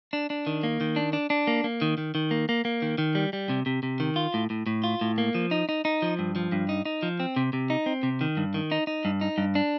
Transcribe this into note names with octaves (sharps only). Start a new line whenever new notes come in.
D4
D4
D#3
A#3
D#3
D4
D4
D4
A#3
A#3
D#3
D#3
D#3
A#3
A#3
A#3
D#3
D#3
G3
G3
C3
C3
C3
D#3
F4
A2
A2
A2
F4
A2
A#3
F3
D#4
D#4
D#4
F3
G2
F3
G2
D#4
D#4
F3
C4
C3
C3
D#4
C4
C3
D#3
G2
D#3
D#4
D#4
G2
D#4
G2
D4